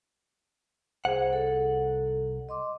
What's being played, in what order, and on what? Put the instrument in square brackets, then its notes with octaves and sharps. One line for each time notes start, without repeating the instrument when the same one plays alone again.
[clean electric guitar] C2 F#5 [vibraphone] G#4 C5
[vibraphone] A4
D#5 C6 D6